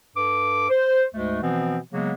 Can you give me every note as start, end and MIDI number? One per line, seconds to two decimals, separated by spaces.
0.16 0.67 43
0.16 0.67 69
0.16 0.67 86
0.70 1.03 72
1.14 1.40 38
1.14 1.40 44
1.14 1.40 56
1.14 1.40 57
1.42 1.77 47
1.42 1.77 52
1.42 1.77 53
1.42 1.77 59
1.42 1.77 60
1.93 2.13 49
1.93 2.13 54
1.93 2.13 56
1.93 2.13 58
1.93 2.13 59